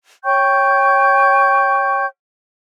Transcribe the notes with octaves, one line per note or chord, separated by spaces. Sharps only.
C#5 G5 C#6 G6